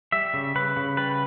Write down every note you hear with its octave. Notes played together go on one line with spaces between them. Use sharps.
G3 E5
C#3
C#3 B4
C#3
G3 B4